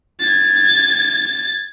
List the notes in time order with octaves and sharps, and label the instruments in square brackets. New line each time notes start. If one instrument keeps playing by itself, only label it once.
[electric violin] G#6 A6